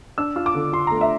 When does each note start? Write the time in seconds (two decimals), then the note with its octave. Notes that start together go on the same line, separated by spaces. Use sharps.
0.18 D4 E6
0.36 F4
0.46 D6
0.55 D3
0.73 F4 C6
0.87 A3 A#5
1.01 E5